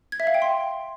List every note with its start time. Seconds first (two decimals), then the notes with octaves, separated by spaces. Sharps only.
0.12 G#6
0.20 E5
0.27 F5
0.34 G5
0.42 C6